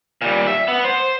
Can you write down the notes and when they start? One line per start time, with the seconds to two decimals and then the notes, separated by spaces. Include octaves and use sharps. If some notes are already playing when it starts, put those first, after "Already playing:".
0.22 A#2 G3
0.47 E5
0.68 B3
0.84 C5